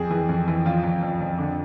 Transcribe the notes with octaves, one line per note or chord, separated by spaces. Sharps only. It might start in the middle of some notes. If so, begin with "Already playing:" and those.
Already playing: F2 G#4
E3
F2
E3
F2 F4
F2
F2
F2
D3